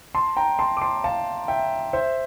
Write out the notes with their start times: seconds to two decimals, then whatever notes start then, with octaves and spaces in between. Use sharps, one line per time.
0.15 A5 C6
0.36 G5 A#5
0.59 A5 C6
0.77 D6
0.81 A5 C6
1.04 F5 A5
1.48 E5 G5
1.93 C5 E5